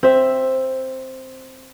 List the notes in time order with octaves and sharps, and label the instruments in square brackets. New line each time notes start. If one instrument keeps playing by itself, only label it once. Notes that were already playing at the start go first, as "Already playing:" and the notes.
[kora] C4 E5